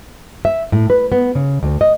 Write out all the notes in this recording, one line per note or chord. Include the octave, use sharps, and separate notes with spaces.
E5
A2
B4
B3
C#3
D2
D#5